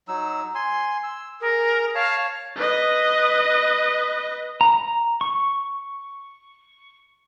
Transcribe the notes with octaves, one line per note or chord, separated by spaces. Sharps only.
F#3 D#4 E6
G#5 C6
E6
G#4 A#4
C#5 F5 A5
B4 D#5
A#5
C#6